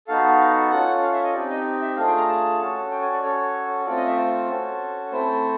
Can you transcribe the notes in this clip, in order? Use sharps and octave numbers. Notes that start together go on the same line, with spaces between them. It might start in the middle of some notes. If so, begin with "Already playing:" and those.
B3 D#4 F#4 A4 F5
C#4 F4 A4 F#5
F5
E5
D#5
C4 D#4 G4 D5
D#5
E5
A3 D4 F4 G#4 F5
G5
A#5
A5
C#4 F#4 A4
G5
G#5
D5
C#4 F#4 A4 C#5
A3 C4 F4 A4 D5
D#5
E5
C5
C#4 F#4 A4
A3 C4 E4 A4 C5